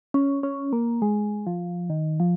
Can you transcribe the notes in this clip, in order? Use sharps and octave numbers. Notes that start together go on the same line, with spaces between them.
C#4
C#4
A#3
G#3
F3
D#3
F3